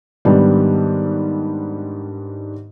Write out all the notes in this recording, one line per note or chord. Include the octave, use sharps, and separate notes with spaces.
G#2 D#3 G3 B3 D4